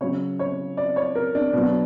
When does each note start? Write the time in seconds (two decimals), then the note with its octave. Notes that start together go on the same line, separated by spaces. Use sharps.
0.01 C#3 F#3 C#5
0.39 C#5
0.77 D5
0.96 C#5
1.15 A#4
1.35 D4
1.53 B2 F#3